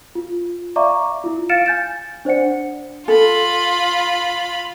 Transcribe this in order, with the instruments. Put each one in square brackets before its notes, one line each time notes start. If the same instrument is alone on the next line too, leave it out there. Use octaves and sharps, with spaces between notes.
[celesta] F4
D5 E5 F5 A#5 C#6 D6
E4 F4
F5 F6 A6 C#7 D7 E7
G#5 G6 A6
D4 C5 D5 F#5 C#7
[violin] F4 B5 [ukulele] A4